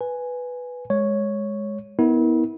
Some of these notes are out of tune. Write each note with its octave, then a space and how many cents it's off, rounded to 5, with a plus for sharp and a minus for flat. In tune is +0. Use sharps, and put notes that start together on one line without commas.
B4 +0 G#5 +0
G#3 +0 C#5 +0
B3 +0 E4 -35 A#4 +0